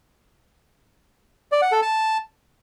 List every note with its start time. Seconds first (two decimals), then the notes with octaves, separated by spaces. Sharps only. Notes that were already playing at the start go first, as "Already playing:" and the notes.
1.52 D5
1.62 F#5
1.72 A4
1.82 A5